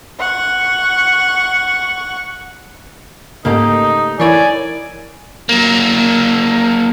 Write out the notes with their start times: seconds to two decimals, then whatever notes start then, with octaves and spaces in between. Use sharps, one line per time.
0.20 F#5 C#6
3.45 G#2 C#3 A3 A#3 C4 D#4 G4
4.19 E3 D#4 E4 A#4 C#5 D5 G#5 G#6
5.49 F#3 A#3